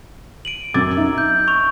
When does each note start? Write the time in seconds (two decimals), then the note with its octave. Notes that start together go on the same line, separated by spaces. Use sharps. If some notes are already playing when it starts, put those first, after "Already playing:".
0.45 D7 D#7 F#7
0.74 F#2 F#3 D6 E6 G#6 A6
0.97 D#4 E5
1.18 G6
1.48 C#6 F7